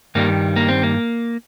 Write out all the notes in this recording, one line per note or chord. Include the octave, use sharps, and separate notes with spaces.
G2 D#3 G3 A#3
A#3
C4
A#3